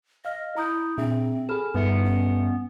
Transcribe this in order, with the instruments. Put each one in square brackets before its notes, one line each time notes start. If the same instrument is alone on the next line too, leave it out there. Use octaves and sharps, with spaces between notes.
[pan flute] D#5 [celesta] F5 F6
[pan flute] E4 [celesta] A#5 D#6 G6
[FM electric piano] A#2 [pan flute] C4 [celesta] D4 G#4 E5
[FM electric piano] G#4 A4 [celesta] B5 F6 E7
[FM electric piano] G2 [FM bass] B3 [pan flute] D#4 [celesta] B4 E5 C#7
[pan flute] C#4